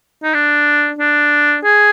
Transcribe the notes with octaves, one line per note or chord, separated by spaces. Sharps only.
D#4
D4
D4
G#4